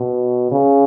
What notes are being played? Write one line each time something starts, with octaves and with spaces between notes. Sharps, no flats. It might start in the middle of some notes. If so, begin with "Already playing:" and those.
Already playing: B2
C#3